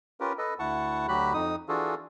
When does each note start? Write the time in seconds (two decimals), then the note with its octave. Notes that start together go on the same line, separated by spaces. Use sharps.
0.20 C#4 F4 G4 A#4 B4
0.38 A4 B4 D#5
0.59 D2 E4 F#5 A5 C#6
1.08 D2 F#3 F#4 G4 B5 F#6
1.34 F2 D#4 D#6
1.69 E3 D4 F4 F#4 G#4 A4